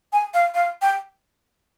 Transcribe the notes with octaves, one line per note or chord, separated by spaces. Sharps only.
G#5
F5
F5
G5